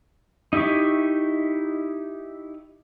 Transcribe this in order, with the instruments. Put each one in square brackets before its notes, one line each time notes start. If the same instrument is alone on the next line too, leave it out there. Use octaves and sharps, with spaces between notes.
[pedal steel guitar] D#4 E4 G4 E5 C#6